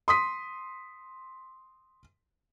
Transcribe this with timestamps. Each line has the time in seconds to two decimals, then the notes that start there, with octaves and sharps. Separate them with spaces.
0.08 C6 D#6 B6